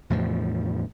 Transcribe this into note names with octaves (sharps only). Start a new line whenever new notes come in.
E2 A2 C3 F3